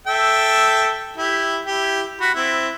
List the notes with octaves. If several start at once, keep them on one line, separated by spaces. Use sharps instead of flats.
A4 E5 G5
E4 G4
E4 G4
F#4 B5
C4 E4